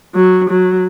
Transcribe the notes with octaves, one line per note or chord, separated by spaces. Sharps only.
F#3
F#3